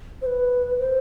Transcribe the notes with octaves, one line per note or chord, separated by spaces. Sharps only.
C5
B4
C5